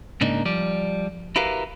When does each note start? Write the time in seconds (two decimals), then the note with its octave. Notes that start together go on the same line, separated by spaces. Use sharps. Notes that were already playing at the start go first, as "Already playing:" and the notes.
0.21 G#2 C#3 A#3 D4 D#4
0.46 F3 G3 D5
1.36 E4 F#4 G4 A#4 B4 F5